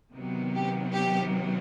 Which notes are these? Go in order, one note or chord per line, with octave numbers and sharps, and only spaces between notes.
C3 D#3 F#3 B3
G4
G4